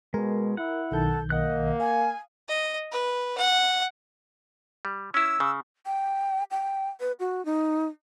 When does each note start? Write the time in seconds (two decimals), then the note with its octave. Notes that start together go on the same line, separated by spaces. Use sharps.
0.14 B2 G#3 A#4
0.57 E4 F#5
0.91 B1 D#3 A4 G6
1.30 A#3 D#5 F#5 F#6
1.80 F5 G#5
2.48 D#5
2.92 B4
3.38 F#5
4.85 G3
5.14 C#4 E4 E6
5.40 C#3
5.86 G5
6.51 G5
7.00 B4
7.20 F#4
7.45 D#4